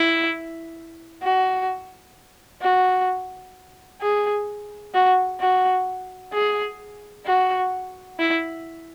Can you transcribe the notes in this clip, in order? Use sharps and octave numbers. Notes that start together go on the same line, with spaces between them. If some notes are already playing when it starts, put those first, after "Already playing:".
Already playing: E4
F#4
F#4
G#4
F#4
F#4
G#4
F#4
E4